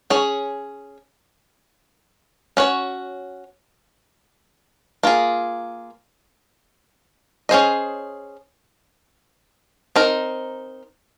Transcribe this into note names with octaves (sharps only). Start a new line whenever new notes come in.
C#4 G#4 C#5
C#4 F#4 C#5
A#3 F4 G#4
C#4 G#4 C5 D#5
C4 D#4 A#4